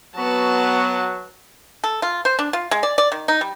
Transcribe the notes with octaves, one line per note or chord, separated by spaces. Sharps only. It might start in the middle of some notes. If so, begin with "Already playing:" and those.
F#3 B3 F#4 B4 A5
A4
F4
C5
D4
F4
G#3
D5
D5
D#3
D#4
G3